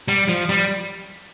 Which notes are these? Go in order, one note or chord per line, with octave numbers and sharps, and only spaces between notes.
G3
F3
G3